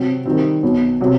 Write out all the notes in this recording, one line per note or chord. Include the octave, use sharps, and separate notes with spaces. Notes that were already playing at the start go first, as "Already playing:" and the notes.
Already playing: C3 F#3 C4
D#3 G3 C4
B1 B2 F#3
C3 F#3